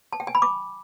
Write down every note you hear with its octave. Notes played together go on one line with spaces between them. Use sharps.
A5
G5
G#5
B5
D6